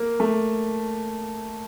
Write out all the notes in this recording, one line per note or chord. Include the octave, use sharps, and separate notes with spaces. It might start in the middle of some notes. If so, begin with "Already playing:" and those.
Already playing: A#3
A3